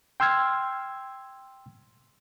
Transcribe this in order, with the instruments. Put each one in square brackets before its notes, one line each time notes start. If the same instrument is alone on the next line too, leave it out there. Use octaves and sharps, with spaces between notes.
[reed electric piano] G5 C6 E6 F6 G#6